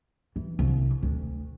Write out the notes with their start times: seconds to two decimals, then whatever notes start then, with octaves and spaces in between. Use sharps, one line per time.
0.36 E3
0.59 C2
1.03 D2